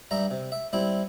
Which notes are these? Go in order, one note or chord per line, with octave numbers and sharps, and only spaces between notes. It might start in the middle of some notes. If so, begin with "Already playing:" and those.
G2 G3 E5 A#5
C3
E5
G3 C4 E4